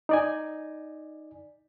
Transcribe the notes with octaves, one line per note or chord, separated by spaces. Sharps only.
D#4 D5 G#5